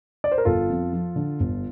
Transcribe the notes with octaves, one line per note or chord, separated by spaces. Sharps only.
D5
C5
A#4
G1 F4 A4
F2
F3
D3
G1